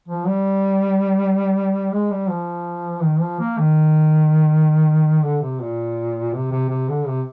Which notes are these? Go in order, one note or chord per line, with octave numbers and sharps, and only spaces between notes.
F3
G3
G#3
G3
F3
D#3
F3
A#3
D#3
D3
C3
A#2
C3
C3
C3
D3
C3